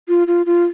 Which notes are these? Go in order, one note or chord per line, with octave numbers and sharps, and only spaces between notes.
F4
F4
F4